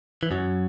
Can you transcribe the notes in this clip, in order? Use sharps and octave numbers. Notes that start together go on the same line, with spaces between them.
E3
F#2 F#3